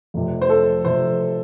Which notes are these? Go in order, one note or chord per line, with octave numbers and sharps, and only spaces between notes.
F1 F2 C3
C5
A4
F1 F2 C3 C5